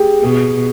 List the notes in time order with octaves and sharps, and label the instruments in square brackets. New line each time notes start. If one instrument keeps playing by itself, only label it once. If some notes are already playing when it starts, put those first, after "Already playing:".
Already playing: [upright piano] G4 G#4
[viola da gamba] B2 [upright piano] G#4